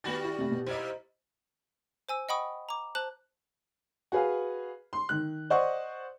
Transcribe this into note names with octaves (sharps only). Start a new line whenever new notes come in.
D#3 G3 B3 F#4 B5 A6
E4 G4
C3 A3
B2
G3 A#3 E4 C5 D#5
C5 G#5 E6
D#5 F#5 G5 B5 C#6 D#6
A#5 D6
C5 A5 F#6 F#7
F#4 G#4 B4 F5
C6
D#3 F#6
C5 D5 D#5 F#5 C#6